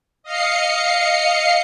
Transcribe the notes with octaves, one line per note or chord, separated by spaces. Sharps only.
D#5 F5 C7 C#7